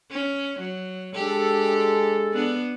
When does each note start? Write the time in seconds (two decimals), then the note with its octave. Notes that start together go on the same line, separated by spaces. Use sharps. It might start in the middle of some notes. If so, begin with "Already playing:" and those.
0.11 C#4
0.60 F#3
1.15 G#3 D4 G4 A4
2.33 B3 D4